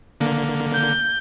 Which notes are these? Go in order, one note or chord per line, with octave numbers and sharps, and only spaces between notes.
D3 A#3
G6